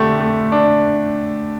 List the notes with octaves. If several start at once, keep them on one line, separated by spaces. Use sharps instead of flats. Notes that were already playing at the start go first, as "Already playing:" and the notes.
Already playing: D3 A3 G4
A3
D4